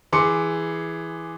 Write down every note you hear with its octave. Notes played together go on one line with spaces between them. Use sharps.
E3 G#4 C6 D6 C#7